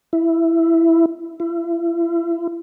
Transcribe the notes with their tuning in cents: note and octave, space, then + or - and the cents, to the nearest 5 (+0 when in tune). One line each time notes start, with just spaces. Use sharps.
E4 +5
E4 +40